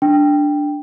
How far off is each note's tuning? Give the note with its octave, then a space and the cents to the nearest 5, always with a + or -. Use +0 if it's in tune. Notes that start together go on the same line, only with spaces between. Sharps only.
D4 +0 G5 +5